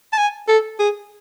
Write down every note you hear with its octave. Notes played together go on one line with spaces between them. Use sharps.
A5
G#5
A4
G#4